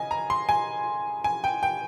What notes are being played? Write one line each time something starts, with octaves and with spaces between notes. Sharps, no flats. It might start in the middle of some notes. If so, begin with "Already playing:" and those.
Already playing: C#3 D#5 G#5
A#5
C6
G#5
G#5
G5
G5